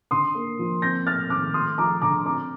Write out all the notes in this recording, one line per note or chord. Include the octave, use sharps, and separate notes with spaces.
D3 C6 D#6
A#3
F3
C4 G6 A#6
A3 F6 A6
D#3 D6 F6
A3 C6 D#6
F3 A#5 D6
D3 A#5 D6
C4 A#5 D6